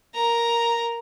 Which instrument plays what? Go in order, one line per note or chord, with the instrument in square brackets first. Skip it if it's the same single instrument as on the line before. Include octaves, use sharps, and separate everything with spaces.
[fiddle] A#4 A#5